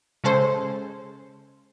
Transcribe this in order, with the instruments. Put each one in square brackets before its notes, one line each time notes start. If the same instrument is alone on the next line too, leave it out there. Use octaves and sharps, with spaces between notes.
[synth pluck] C#3 G#3 A4 C5